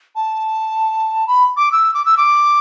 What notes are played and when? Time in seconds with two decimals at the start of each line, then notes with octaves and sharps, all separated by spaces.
0.15 A5
1.27 B5
1.56 D6
1.71 E6
1.93 D6
2.05 E6
2.17 D6